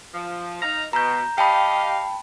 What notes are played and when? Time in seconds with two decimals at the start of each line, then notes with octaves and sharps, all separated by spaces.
0.14 F3
0.62 D#4 F5 A#5
0.93 B2 A#5 G6
1.38 G4 D#5 F5 G5 A5 B5